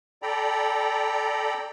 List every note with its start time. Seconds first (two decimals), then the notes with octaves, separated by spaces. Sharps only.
0.22 A4 D5 G5 A#5 B5